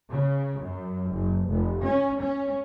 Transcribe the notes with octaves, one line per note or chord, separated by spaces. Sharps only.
C#3
F#2
F#1
F1
C#4
C#4